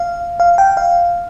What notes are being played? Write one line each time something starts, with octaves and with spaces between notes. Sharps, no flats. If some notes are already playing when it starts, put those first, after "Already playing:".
Already playing: F5
F5
G5
F5